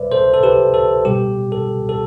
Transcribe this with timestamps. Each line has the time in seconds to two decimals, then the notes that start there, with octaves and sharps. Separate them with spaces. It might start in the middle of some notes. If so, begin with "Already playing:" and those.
Already playing: B2 G3 B4 C5 D5 E5
0.11 A4 C5
0.34 A4
0.43 G4 B4
0.74 A4
1.05 B2 G3 G4
1.52 A4
1.89 A4